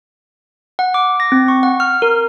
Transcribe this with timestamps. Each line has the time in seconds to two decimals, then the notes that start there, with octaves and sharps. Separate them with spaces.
0.79 F#5
0.94 D6
1.20 A#6
1.32 C4
1.48 C#6
1.63 F#5
1.80 F6
2.02 A#4